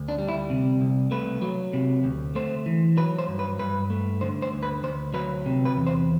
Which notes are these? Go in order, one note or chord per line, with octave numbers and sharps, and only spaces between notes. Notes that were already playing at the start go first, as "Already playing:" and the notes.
Already playing: D2
D4
G3
E4
C3
C2
A3 B4
F#3
C3
D2
A3 C5
E3
F#3 B4
C5
G2
B4
G2 B4
A3
D3 C5
C5
D2
B4
D2 C5
F#3 B4
C3
B4
E2
C5